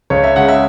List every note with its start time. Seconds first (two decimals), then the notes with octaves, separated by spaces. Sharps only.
0.10 C#2 C#5
0.24 E5
0.36 C#3 G#3 F#5
0.48 E5